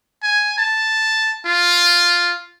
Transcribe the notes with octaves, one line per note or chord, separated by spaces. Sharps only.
G#5
A5
F4